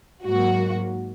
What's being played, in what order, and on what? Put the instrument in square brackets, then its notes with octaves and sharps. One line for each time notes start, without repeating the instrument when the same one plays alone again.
[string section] G#2 F#3 A#3 F#4